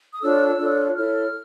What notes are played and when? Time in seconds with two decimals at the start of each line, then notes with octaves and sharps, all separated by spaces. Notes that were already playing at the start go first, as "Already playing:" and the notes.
0.13 D#6
0.21 D4 F4 A4 C#5 E6
0.58 D4 F4 A4 C#5
0.96 E4 A4 C#5 F6